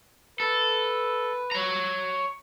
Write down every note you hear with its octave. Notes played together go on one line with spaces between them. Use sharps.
A4 B4
C#5 A#5